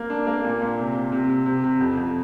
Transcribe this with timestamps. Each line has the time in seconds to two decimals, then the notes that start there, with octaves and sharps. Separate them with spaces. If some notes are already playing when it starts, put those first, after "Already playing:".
Already playing: A#3
0.10 D4
0.27 A#3
0.44 A#2
0.62 A#2
0.79 C3
0.96 C3
1.12 C3
1.30 C3
1.46 C3
1.64 C3
1.81 F2
1.97 F2